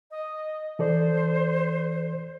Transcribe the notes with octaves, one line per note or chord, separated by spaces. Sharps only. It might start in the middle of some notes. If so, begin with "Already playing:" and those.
D#5
E3 A4 C5 D5